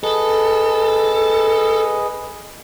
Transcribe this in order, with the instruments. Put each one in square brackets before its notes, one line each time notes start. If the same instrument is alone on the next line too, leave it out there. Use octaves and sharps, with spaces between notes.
[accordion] G#4 B4 D#5 [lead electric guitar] A4